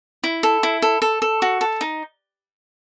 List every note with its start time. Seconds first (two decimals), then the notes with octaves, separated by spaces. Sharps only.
0.24 E4
0.43 A4
0.63 E4
0.82 A4
1.02 A4
1.22 A4
1.42 F#4
1.61 A4
1.81 D#4